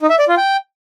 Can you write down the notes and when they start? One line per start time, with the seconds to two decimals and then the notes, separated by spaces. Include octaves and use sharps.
0.01 D#4
0.10 E5
0.19 D5
0.28 F4
0.37 G5